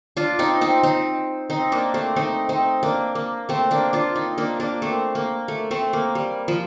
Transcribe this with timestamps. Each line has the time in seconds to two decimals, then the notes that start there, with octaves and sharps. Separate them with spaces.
0.17 D4 F4
0.39 C4 D#4
0.61 C4 D#4
0.83 C4 D#4
1.50 C4 D#4
1.72 A#3 D4
1.94 A3 C4
2.16 C4 D#4
2.49 C4 D#4
2.83 A#3 D4
3.15 A#3
3.49 A3 C4
3.71 A#3 D4
3.93 D4 F4
4.15 C4 D#4
4.38 A#3 D4
4.60 A#3 D4
4.82 A3 C4
5.15 A#3
5.48 A3
5.71 A3 C4
5.93 A#3
6.15 G3
6.48 F3